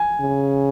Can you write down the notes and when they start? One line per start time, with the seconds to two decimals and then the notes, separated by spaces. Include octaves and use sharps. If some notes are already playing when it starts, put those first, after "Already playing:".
Already playing: G#5
0.20 C#3